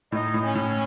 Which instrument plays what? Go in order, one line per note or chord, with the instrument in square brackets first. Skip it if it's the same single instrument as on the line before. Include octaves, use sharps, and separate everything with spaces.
[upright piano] A2 [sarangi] D#4
[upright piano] A2
[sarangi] C#4
[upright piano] A2